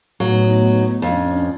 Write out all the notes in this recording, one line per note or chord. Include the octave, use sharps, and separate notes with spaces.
A2 F#3 B3 D#4
F2 C#4 D4